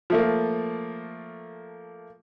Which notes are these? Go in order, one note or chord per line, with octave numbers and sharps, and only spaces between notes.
F3 A3 A#3